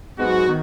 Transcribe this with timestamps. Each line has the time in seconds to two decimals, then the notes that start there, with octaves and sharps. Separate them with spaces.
0.18 G#2 F#3 B3 F#4
0.48 D#3